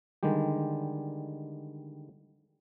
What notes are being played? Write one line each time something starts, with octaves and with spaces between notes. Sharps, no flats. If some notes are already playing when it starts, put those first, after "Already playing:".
D3 D#3 G3 G#3 G4